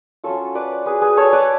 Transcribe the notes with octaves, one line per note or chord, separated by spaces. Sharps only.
F#3 C#4 F4 A4 C#5
B4 D5
G#4 B4
G#4 B4
A4 C#5
B4 D5